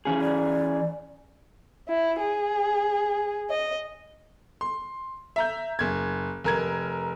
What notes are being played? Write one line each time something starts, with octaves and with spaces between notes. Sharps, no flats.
E3 C#4 G#4
D5
E4
G#4
D#5
C6
E5 A#5 G6
F#1 G#6
F1 A#4 G#6